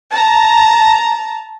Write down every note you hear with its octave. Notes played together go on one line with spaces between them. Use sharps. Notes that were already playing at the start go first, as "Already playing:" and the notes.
A5 A#5